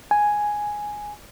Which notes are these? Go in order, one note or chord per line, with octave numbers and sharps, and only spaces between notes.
G#5